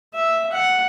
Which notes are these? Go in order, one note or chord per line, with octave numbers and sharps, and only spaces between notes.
E5
F#5